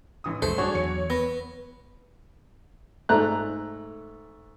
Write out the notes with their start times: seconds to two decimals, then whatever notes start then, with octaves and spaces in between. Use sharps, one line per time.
0.24 A1 E3 D#6
0.42 C2 F2 G#2 A3 C5
0.58 G2 D4 F#4 G#4 C#5
0.74 E2 F#3 C#7
1.10 B3 A#6
3.09 G#2 A3 A#5 F#6